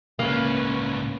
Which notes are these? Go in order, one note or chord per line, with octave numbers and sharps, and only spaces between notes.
C#2 A2 A#3 C#4 B4